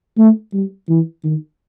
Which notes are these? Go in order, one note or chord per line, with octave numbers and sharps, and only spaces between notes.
A3
G3
E3
D#3